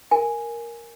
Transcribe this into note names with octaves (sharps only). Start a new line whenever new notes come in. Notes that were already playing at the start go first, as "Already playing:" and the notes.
A#4 G#5